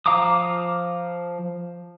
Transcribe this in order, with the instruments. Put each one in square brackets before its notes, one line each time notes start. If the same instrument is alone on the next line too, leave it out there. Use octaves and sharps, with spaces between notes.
[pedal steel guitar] F3 F5 A#5 D6 D#6